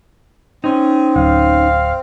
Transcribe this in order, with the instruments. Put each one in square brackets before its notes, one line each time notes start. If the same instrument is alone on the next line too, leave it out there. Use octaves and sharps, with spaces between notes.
[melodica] C4 [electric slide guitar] C#4 D#4
[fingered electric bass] D1 [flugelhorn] F5